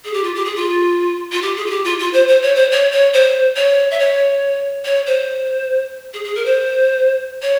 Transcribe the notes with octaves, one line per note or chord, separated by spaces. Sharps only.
G#4
G4
F4
G4
G#4
F4
F4
G4
G#4
F4
G4
F4
F4
C5
C5
C#5
C5
C#5
C#5
C5
C#5
E5
C#5
C#5
C5
G#4
G#4
A#4
C5
C#5